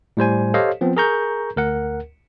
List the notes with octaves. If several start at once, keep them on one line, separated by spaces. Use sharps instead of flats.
A2 G3 C5 G#5
G4 A4 C5 C#5 D#5 F5
F3 B3 C4
G#4 A#4 A#5 C#6 G6
D2 A#4 F#5